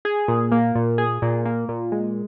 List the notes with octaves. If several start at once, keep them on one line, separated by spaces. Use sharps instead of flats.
G#4
A#2
A#3
A#2
G#4
A#2
A#3
A#2
G#3